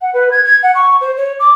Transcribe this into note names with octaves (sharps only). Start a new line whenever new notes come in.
F#5
B4
G#6
G#6
F#5
C#6
C5
C#5
D6